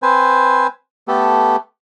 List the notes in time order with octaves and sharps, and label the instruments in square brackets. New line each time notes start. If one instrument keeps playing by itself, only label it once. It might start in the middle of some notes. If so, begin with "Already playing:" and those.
[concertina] C4 B4 C5 G#5
A3 B3 G4 A4